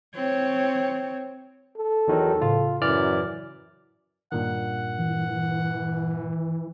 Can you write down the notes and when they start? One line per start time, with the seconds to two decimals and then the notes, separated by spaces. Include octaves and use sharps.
0.15 C4 C#5
1.77 A4
2.08 E2 D#3 F#3
2.42 A2 C#3 F4
2.82 F#2 E3 D5 F6
4.32 G2 A#2 D#3 F#5
4.99 E3